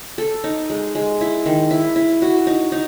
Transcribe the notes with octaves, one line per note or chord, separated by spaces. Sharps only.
A4
D#4
G#3
G#3
E4
D#3
E4
E4
F#4
D#4
D#4